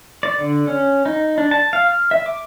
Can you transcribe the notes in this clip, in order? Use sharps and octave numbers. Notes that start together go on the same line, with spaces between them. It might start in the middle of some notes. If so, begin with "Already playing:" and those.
D5
D3
C#4
D#4
D4
A5
F5
F6
E5
D6